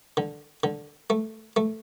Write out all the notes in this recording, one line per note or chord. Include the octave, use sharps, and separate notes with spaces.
D3
D3
A3
A3